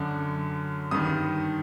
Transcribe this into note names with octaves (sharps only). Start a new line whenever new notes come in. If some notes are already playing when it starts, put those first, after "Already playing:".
Already playing: F#2 D3
G2 D#3 D#6